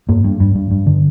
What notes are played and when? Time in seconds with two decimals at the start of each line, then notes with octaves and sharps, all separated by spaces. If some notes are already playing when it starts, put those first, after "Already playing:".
0.09 G2 A#3
0.24 G2
0.40 G2
0.55 G2
0.71 G2
0.86 D3